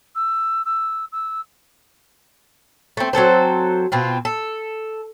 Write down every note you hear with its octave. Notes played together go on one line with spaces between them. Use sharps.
E6
E6
E6
A3 C4
F#3 C4 A4 C5
B2 C4 F4
A4